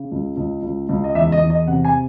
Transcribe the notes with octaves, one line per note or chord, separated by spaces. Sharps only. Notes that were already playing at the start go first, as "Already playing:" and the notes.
Already playing: C#3
C#2
C#2
C#2
C#2
D#5
E2 E5
D#5
E2
D#5
C3 F#5
G#5